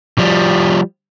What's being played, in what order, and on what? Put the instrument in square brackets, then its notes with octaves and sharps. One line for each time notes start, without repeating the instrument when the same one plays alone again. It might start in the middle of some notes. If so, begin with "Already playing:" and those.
[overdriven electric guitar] F3 G3